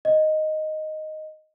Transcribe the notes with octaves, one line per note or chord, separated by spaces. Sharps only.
D#5